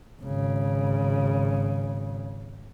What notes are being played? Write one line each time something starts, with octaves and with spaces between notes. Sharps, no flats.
G#1 C#3